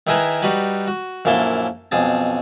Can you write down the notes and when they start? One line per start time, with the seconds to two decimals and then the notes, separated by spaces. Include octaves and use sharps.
0.07 D#3 E4 G#4 A#4 B4
0.42 G3 D#4 F#4 B4
0.88 F#4
1.25 A#1 F#2 A#3 E4 A4 C6
1.92 B1 F2 G#4 A5